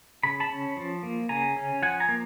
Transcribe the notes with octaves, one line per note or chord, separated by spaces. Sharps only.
C#3 B5
A5 B5
C#4
F3
A#3
C#3 G#5 A#5
C#4
F3 F#5 G#5
G#5 A#5
A#3